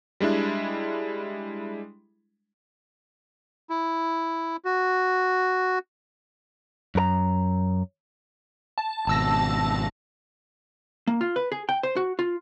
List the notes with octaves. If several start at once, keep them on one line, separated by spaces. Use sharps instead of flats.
G3 G#3 D4 E4
E4
F#4
F#2 A#4 A#5
A5
G#1 B2 A5 E6 A#6
A#3
F4
B4
G#4
G5
C5
F#4
F4